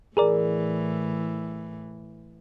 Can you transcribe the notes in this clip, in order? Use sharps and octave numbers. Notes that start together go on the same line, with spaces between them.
A2 E3 G#4 A#4 D5